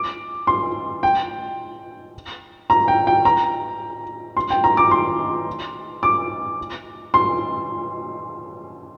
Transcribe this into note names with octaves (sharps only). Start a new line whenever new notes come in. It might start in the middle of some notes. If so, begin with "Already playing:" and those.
Already playing: D6
C6
G5
A#5
G5
G5
A#5
C6
G5
A#5
D6
C6
D6
C6